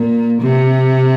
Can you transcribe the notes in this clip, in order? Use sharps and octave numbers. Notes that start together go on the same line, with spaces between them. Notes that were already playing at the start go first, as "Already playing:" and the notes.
Already playing: A#2
C3